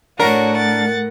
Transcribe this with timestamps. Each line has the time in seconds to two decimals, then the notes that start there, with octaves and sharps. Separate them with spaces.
0.20 A2 D4 F#4 A#4 C#5
0.56 F#5 A6